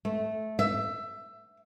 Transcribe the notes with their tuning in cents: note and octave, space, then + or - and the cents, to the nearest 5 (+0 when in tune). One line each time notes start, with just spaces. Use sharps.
A3 -15
E5 +15